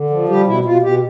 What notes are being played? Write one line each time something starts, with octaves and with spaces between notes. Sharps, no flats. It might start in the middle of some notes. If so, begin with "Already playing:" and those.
Already playing: D3
F3
G3 G4
B2 E4
B2 F4
B2 G4